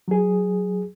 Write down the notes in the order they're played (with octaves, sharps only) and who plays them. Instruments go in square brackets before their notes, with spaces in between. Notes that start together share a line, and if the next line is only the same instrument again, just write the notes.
[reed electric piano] F#3 G#4